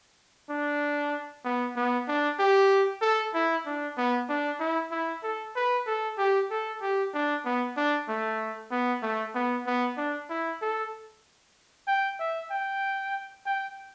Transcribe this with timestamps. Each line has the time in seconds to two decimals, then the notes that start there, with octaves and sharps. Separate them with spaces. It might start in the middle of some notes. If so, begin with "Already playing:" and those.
0.50 D4
1.45 B3
1.76 B3
2.08 D4
2.39 G4
3.02 A4
3.34 E4
3.66 D4
3.98 B3
4.29 D4
4.60 E4
4.91 E4
5.24 A4
5.56 B4
5.87 A4
6.18 G4
6.51 A4
6.82 G4
7.14 D4
7.45 B3
7.77 D4
8.09 A3
8.72 B3
9.02 A3
9.35 B3
9.67 B3
9.97 D4
10.30 E4
10.62 A4
11.88 G5
12.20 E5
12.51 G5
13.46 G5